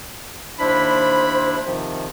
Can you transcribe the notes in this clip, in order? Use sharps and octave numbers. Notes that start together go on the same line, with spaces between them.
D#2 D4 E4 C5 B5
C3 D#3 F3